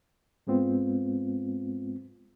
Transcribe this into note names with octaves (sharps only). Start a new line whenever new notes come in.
G#2 G#3 B3 C4 F4